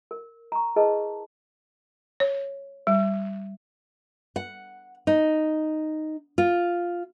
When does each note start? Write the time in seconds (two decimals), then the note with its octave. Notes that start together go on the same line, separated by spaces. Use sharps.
0.11 A#4
0.52 A#5 C#6
0.76 E4 G#4 A#4 B4 D#5 A5
2.20 C#5
2.87 G3
4.36 F#5
5.07 D#4
6.38 F4